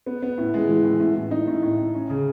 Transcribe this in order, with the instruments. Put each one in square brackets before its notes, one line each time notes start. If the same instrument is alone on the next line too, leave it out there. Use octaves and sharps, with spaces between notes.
[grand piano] B3
B3
A2
G#3
E3
A2
A2
A2
D#4
A2
A2
A2
C#4
C#3